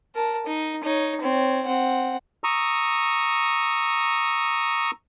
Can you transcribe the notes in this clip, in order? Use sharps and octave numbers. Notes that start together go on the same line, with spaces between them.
A#4 A5
D#4
D#4 C#5
C4 C#5
C4 F#5
A#5 C#6 D#6 E6